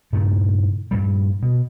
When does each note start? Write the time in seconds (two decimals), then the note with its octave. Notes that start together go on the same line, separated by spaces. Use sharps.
0.13 G2 A#2 C#3 A3
0.91 G2 A#2 G3
1.43 B2